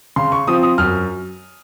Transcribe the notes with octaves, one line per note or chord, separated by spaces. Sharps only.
C#3 C6
C#6
F3 C4 D#6
D#6
F#2 F6